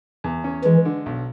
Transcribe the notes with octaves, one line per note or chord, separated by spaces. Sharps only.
E2
C#4
E3 G#3
D3
B1